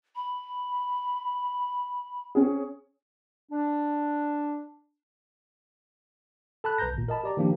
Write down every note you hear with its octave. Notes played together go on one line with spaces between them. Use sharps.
B5
C4 C#4 G#4
D4
A4 A5 B5 F#6
B1 B4 A#5 G6 A#6
G#1 A#2
A#4 D#5 A5 B5
G4 D5 A#5
D#3 F3 A#3 D4 G4